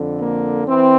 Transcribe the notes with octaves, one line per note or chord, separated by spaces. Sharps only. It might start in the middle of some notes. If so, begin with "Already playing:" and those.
Already playing: F2 D3
A#3
E3 C4